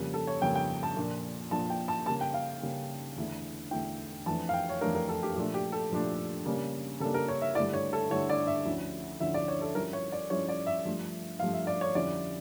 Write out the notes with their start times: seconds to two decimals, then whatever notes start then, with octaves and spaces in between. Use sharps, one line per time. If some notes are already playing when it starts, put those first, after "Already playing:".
Already playing: F2 C#3 G3 A#3
0.14 A4
0.27 C#5
0.42 F2 C#3 G3 A#3 G5
0.55 G5
0.83 A5
0.96 A#2 F3 A#3 D4
1.51 A#2 F3 A#3 D4 A5
1.70 G5
1.88 A5
2.06 C#3 G3 A#3 A5
2.21 G5
2.34 F5
2.62 C#3 G3 A#3
3.16 E2 D3 A3 E4
3.71 E2 D3 A3 E4 G5
4.26 F2 E3 A3 D4 A5
4.49 F5
4.54 G5
4.69 C#5
4.81 F2 E3 A3 D4 A#4
4.95 A#4
5.09 A4
5.23 G4
5.36 A#2 F3 A3 D4 G4
5.54 G4
5.72 A4
5.91 A#2 F3 A3 D4
6.46 C#3 G3 A#3 D4
7.00 C#3 G3 A#3 D4 A4
7.14 A#4
7.28 C#5
7.42 E5
7.55 G2 D3 A3 E4 D5
7.73 C#5
7.93 A4
8.10 G2 D3 A3 E4 C#5
8.29 D5
8.47 E5
8.65 D2 D3 F3 C#4 E4
9.20 D2 D3 F3 C#4 E4 E5
9.34 D5
9.48 C#5
9.61 A4
9.75 G2 F3 C#4 E4 A#4
9.93 C#5
10.12 D5
10.30 G2 F3 C#4 E4 C#5
10.49 D5
10.66 E5
10.85 G2 F3 A3 D4
11.39 G2 F3 A3 D4 F5
11.53 E5
11.67 D5
11.81 C#5
11.95 F2 D3 G3 C#4 E4 D5